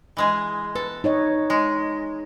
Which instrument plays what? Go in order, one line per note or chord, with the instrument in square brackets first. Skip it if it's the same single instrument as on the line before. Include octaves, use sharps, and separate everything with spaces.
[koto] E3 G#3 G#4
[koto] A4 [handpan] B4
[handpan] D#4 C#5 D#5
[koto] G#3